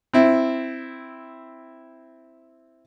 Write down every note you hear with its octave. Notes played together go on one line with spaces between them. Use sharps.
C4 E4